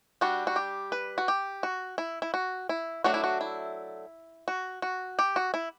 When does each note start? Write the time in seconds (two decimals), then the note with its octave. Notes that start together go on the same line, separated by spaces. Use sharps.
0.21 G3 D4 F#4
0.47 F#4
0.56 G4
0.92 B4
1.18 F#4
1.28 G4
1.63 F#4
1.98 E4
2.22 E4
2.34 F#4
2.69 E4
3.04 F#3 A3 D4 F#4
3.14 E4
3.24 F#4
3.41 E4
4.48 F#4
4.82 F#4
5.19 G4
5.36 F#4
5.54 E4